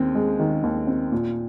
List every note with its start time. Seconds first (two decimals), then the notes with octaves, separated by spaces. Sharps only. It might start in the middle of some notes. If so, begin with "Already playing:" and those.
Already playing: D#2 C4
0.15 G#3
0.39 D#3
0.63 D#2
0.87 C4
1.12 A#2